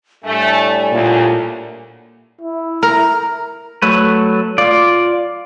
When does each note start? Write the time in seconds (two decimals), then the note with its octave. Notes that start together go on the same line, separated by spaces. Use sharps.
0.24 A2 G3 A3 D4 G#5
0.93 D2 A#2
2.41 E4
2.83 A#4 A#5
3.82 F#3 A3 B4
4.58 F4 D5